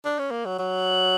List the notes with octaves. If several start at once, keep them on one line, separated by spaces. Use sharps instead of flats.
D4
C#4
A#3
F#3
F#3